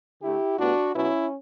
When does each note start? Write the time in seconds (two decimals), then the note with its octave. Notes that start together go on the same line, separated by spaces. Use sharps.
0.22 D3 A3 E4 G4
0.58 A2 G3 B3 D4 F#4
0.94 B2 F#3 B3 C#4 E4